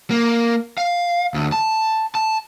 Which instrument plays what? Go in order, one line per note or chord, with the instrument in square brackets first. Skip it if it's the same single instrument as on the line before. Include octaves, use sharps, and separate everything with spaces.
[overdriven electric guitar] A#3
F5
D2
A5
A5